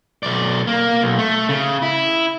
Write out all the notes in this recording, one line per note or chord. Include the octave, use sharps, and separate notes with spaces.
B1 D5
A#3
B1
A3
C#3
E4